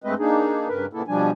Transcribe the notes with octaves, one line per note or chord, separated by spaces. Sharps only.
G2 G#3 A3 C4 B4 D#5
A#3 D4 D#4 G#4
G2 C#3 A#4 B4
A#2 C#3 A#3 B3 E4 A4
B2 F3 G3 D4 G#5